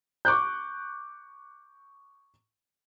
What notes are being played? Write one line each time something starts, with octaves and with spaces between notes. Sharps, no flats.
C#6 D6 F#6 G6